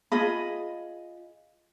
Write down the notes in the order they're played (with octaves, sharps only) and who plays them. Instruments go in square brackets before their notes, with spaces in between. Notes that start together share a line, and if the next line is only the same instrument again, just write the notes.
[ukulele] F4 G#4 D#5 B5